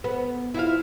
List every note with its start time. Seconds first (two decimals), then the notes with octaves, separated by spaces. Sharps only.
0.04 B3
0.54 E4 F4 F5